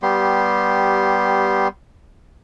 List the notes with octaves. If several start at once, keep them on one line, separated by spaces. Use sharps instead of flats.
G3 B3 G4 C6